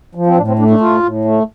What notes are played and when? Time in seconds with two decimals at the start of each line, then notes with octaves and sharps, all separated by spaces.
0.15 F3
0.26 C4
0.37 A2 D4
0.48 C4
0.59 A3 D4
0.70 D4
0.80 A2 F4
1.03 A2
1.25 A3